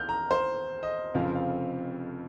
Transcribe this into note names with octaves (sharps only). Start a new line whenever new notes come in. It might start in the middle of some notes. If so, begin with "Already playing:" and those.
Already playing: F6 G6
A#5
C5
D#5
F1 F2 C#3 F3 C4 F5
F5